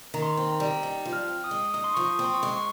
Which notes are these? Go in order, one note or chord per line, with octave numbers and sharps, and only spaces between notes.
D#3 A#5
C6
C4
A#5
G3
D#4
F3
F6
C4
D#6
G#3
D#4 D#6
C6
F3 C#6
D#6
C4
C6
C#6
G#3
C#6